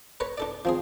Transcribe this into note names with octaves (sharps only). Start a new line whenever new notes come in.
A#4 B4 C#5
D4 A4 D5
F3 C4 G#4